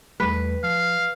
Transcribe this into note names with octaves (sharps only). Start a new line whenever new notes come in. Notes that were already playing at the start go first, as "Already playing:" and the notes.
E2 G3 A3 B4
F3 F5